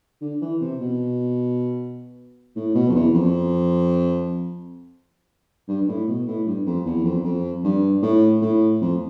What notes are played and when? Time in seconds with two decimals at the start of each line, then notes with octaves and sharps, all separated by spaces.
0.21 D3
0.41 E3
0.61 C3
0.80 B2
2.56 A2
2.75 B2
2.89 F2
2.95 E2
3.14 F2
5.69 G2
5.82 G2
5.89 A2
6.08 B2
6.27 A2
6.47 G2
6.66 F2
6.86 E2
7.05 F2
7.24 F2
7.64 G2
8.02 A2
8.42 A2
8.82 F2